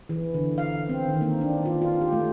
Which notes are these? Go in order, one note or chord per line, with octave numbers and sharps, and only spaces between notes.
E3
D3
F5
C4
D#3
A#3
D4
F4
F4
G4
A3